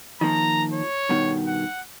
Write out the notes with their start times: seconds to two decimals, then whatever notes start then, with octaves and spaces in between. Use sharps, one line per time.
0.21 D#3 F3 A#3 A#5
0.73 C#5
1.09 G2 B2 D#3
1.47 F#5